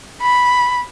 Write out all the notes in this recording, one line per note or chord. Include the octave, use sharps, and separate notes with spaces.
B5